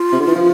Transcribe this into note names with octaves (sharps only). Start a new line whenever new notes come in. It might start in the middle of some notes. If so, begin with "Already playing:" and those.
Already playing: F4
C3
D3
E3
F3